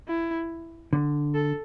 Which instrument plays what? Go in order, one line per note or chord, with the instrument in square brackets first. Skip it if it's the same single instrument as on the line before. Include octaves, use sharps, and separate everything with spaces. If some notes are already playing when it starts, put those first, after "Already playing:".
[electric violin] E4
[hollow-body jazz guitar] D3
[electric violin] A4